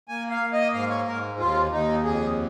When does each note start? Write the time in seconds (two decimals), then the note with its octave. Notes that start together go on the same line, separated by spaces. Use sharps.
0.08 A#3 G#5
0.30 F5
0.41 A#3
0.53 D#5
0.73 G#2 F5
0.90 C#5
1.07 G#2 A#4
1.39 D#2 F4
1.72 D#2 D#4
2.04 F2 G#4